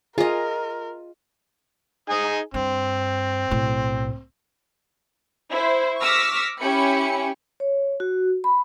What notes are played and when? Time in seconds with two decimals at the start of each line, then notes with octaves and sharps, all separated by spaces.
0.18 F4 G#4 A#4 D#5
2.10 D#4 G#4 G#5
2.54 G2 C4
3.51 B1 A2
5.50 E4 C5
6.00 C#6 D6 E6 F6 A#6 B6
6.61 C#4 E4 G4 G#5 B5 C#7
7.60 C#5
8.00 F#4
8.44 B5